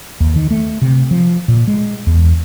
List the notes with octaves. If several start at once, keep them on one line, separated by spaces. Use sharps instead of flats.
D#2
D#3
A3
C3
F3
A#2
G#3
E2